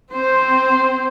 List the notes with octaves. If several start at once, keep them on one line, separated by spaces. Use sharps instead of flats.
C4 C5